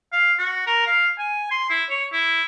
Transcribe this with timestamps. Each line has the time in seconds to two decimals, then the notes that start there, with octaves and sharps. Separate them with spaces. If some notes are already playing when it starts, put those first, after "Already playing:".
0.12 F5
0.38 F#4
0.67 A#4
0.86 F5
1.18 G#5
1.51 C6
1.70 E4
1.89 C#5
2.12 E4